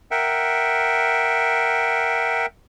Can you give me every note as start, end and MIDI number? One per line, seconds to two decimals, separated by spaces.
0.11 2.46 70
0.11 2.46 76
0.11 2.46 78
0.11 2.46 79